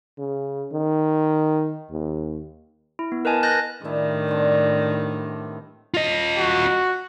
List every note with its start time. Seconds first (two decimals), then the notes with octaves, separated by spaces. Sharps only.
0.18 C#3
0.72 D#3
1.91 D#2
2.99 E4
3.12 B3
3.25 A#4 B4 D#5 G#5 A5
3.43 D#5 F#6 G6 A6 A#6
3.84 A2 D#3 G3 D4 E4
4.26 B3 C4 D4
5.94 F4 D#5
6.38 F#4